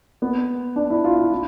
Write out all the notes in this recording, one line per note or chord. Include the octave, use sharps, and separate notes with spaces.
B3
D4
E4
F4
F4
E4